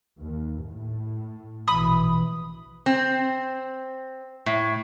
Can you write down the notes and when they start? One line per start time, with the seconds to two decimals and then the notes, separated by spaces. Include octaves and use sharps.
0.19 D#2
0.66 A2
1.68 A#1 B2 E3 B5 D#6
2.86 C4
4.46 A2